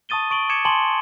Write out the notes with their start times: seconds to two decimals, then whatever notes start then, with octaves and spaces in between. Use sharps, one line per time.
0.09 A5 C#6 D#6 A6 D#7 G7
0.31 C#6 D7 F#7 G7
0.49 D6 G#6 C#7 E7
0.65 G#5 A5 C6 F#7 G7